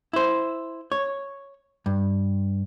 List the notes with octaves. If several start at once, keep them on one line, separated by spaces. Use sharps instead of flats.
E4 C5
C#5
G2